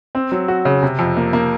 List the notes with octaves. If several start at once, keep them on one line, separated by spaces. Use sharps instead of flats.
C4
F#3
F#4
C#3
C3
F2
A#3
A#3